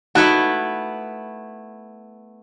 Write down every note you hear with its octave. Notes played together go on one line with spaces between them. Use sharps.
A3 B3 D#4 E4 F#4 F#5